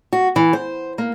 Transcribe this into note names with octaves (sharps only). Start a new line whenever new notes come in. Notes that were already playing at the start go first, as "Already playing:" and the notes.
F#4
E3
C5
A#3